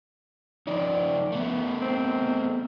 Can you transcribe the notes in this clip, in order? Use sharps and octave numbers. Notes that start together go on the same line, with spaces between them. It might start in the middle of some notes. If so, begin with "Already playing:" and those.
F3 D#4 D5
A3 B3
C4